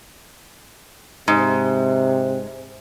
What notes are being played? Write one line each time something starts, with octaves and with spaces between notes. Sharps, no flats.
G#2 C3